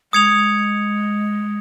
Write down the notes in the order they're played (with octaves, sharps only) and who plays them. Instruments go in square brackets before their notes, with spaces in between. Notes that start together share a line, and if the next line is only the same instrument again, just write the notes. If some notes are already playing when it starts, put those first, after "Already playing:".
[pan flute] G#3 [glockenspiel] D#6 G#6 C#7 F7